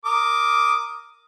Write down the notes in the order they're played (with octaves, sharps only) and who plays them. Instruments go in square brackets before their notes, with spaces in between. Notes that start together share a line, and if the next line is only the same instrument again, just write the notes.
[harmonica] A#4 D6 D#6